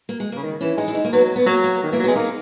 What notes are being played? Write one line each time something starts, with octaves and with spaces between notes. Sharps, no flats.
A#3
G#3
A#3
C#3
D#3
E3 C#4
G#3 D#4
E4
D#4
A#3
F#3 B3
B3
F#3 A#3
A#3
D#3
E3 A#3
F#3
B3
G#3
A#3 D#4